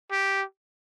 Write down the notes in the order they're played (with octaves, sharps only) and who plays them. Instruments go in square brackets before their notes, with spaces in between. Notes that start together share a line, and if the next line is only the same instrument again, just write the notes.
[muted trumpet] G4